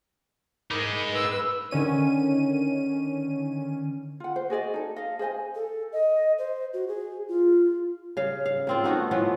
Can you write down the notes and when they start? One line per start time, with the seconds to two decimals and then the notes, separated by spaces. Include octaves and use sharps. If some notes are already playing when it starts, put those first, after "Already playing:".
0.71 G#3 D#4 A#4 B5 D6
1.12 B4 E6
1.71 D3 D#3 C#4 D#7
4.20 F4 F#5
4.36 C5
4.50 F#4 G#4 D5 D#5
4.74 D#4 A4
4.96 D#5 F5
5.19 G#4 C5 D#5 G#5
5.55 A4
5.92 D#5
6.38 C5
6.73 F#4
6.88 G#4
7.28 F4
8.17 C#3 F5
8.46 F5
8.67 A#3 C4 F4
8.84 A3 B3 D#4 F#4
9.11 E3 F3 B3 C#4